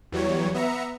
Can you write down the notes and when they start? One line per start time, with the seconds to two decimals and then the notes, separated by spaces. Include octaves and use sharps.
0.12 E2 E3 F#3 G3 C#5
0.55 B3 E5 A#5 C#7